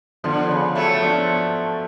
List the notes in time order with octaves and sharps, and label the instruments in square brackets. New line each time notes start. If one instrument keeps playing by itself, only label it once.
[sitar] D3 [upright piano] F3 B3 D4 F4
[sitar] C#3
F#3 A3
[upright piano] F3 B3 D4 F4